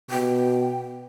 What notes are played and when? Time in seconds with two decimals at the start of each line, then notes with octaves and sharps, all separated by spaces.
0.10 B2 G5